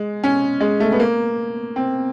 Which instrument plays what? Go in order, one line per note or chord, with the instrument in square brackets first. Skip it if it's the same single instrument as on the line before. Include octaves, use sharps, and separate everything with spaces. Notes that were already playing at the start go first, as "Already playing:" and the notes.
Already playing: [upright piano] G#3
C#4
G#3
A3
B3
A#3
C4